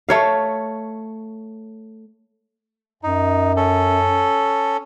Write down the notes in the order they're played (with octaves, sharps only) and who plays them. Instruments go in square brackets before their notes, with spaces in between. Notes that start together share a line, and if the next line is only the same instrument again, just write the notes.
[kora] A3 C#5 F5
[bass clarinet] F#2 [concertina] D#4
[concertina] C#4 A4